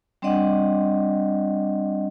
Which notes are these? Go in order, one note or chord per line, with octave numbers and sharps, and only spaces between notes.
G3 C4 D4 D5 D#5 F#5